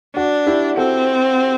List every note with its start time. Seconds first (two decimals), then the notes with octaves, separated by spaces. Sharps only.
0.15 D4 F#4
0.47 E4 G4
0.77 C4 F#4 A4